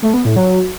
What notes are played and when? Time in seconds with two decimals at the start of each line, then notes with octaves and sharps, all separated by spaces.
0.02 A3
0.14 B3
0.25 A2
0.36 F#3